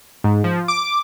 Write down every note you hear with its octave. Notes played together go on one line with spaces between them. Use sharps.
G#2
F3
D6